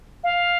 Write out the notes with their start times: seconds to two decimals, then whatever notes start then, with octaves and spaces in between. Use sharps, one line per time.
0.23 F5